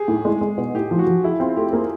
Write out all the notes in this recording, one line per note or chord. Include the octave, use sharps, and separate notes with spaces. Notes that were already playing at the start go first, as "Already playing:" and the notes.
Already playing: G4 G#4
A2
G#3
G#3
B2
A2 G4
F3
F#4
F3
E4 G#4
C4 F4
A3 G4
A#3 G#4